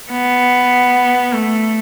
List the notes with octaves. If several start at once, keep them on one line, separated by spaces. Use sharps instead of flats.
B3
A3